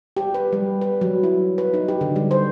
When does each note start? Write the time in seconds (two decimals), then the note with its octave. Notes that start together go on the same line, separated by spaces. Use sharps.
0.17 G4
0.34 B4
0.53 G3
0.81 B4
1.01 F#3
1.23 E4
1.58 B4
1.74 D#4
1.88 G4
2.01 D3
2.16 G3
2.31 C5